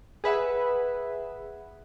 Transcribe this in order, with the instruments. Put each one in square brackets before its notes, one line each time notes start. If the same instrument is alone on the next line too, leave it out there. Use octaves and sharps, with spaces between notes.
[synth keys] G#4 B4 E5 F#5